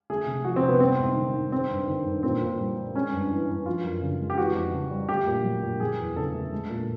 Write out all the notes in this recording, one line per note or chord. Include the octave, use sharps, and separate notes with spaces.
A3 G#4
C3
F3 F#4
C4
C3
B3
G3 C4
G#2
D#3
G#2
G#3 C4
G2
D#3
G2
A#2 C4
A#2
G3
G3
G#3 C#4
G2
E3
G2
F3 F4
F#2
C#3
G#3
G4
E3 F#4
F2
C#3
G3
A3 G4
A#2
F#3
A#2
F#3 G#4
E2
C#3 A4
A3
G#3
A#2